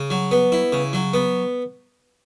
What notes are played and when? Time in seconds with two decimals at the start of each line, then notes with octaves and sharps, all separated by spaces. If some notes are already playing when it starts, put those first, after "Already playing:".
Already playing: C#3
0.10 F#3
0.31 B3
0.52 E4
0.72 C#3
0.93 F#3
1.14 B3